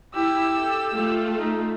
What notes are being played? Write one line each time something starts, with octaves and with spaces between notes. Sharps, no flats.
E4 G4 E6
A4
A3 F4
D#4